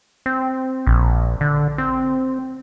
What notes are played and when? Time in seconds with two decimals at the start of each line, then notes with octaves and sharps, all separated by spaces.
0.26 C4
0.87 A#1
1.41 D3
1.78 C4